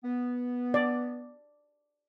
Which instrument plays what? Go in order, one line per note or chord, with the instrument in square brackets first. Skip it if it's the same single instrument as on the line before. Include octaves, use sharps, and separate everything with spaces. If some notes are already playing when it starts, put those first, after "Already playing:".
[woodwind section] B3
[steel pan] D5